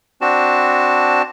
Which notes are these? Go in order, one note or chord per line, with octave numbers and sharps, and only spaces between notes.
C4 D4 F#4 A5